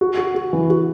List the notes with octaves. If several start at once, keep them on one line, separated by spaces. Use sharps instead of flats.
F#4
F#4
F#4
E3
F#4